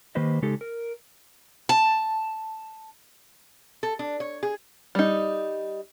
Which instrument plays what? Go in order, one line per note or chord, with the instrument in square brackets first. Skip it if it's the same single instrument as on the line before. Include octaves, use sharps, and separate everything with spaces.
[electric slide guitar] D#3 A#3 G4 B4 C5 D#5
C#3 G#3 D#4 G4 A4
A#4
[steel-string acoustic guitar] A5
[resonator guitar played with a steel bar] A4
D4
C#5
G#4
[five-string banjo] G3 D#4